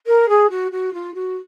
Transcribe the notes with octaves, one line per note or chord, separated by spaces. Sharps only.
A#4
G#4
F#4
F#4
F4
F#4